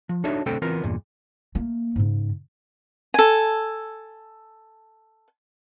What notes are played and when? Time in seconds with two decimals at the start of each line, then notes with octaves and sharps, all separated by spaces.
0.09 F3
0.24 D4 D#4 F#4 A4 C#5 E5
0.46 B1 D3 A3 C4 A4 G5
0.62 E3 B3 C4 F4 A#4
0.83 E2 G2 A#2
1.55 A3 A#3
1.96 G#2 C#3
3.14 A4 G#5